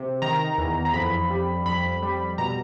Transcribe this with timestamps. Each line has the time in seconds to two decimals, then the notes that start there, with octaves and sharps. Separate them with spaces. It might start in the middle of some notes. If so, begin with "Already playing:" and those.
Already playing: C3
0.22 D#3 A#5
0.58 E2
0.85 A#5
0.93 F2 B5
1.30 G3
1.66 F2 B5
2.02 G3
2.38 B2 A#5